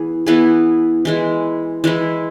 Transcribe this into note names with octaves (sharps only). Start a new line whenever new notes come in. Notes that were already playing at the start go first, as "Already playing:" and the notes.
Already playing: E3 B3 E4 G#4
E3 B3 E4 G#4
E3 G#3 E4
E3 G#3 E4